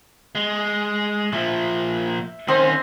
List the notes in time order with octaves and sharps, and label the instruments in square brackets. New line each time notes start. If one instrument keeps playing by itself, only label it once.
[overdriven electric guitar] G#3
[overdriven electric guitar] A#2 F3 [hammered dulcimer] E5
[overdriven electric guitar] D#3 C#4 [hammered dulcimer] C4 D#5 C6